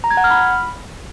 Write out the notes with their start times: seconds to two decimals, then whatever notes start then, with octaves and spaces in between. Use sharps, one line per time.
0.04 A#5
0.11 G#6
0.17 F#5
0.24 F6
0.31 B5